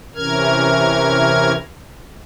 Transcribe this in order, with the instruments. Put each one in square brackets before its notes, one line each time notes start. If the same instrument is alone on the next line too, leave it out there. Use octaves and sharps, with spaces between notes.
[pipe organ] C3 E3 C#4 A#4 F6 G#6